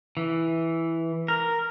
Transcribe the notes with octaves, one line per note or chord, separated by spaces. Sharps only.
E3
A#4